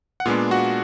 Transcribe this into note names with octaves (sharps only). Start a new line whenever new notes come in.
F#5
A#2 G#3 B3 D4 F4 F5
F#4 F#5